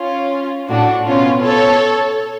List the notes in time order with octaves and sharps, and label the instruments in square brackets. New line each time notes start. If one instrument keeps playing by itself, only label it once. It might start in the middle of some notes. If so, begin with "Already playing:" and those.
Already playing: [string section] C#4 F4
[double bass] A2 [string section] D4 F#4
[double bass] B2 [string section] C#4 F4
[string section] A4 C#5